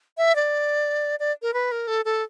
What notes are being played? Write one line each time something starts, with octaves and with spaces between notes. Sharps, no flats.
E5
D5
D5
A#4
B4
A#4
A4
A4